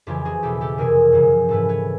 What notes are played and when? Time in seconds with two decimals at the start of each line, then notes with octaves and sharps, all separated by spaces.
0.07 F2 C#3 E3 F4 G4
0.25 F#4 G#4
0.43 E2 B2 G4 A4
0.61 G4 A4
0.78 F2 C3 E3 G#4 A#4
1.12 F#2 C#3 F3
1.49 G#2 E3 A4 B4
1.69 B4 C#5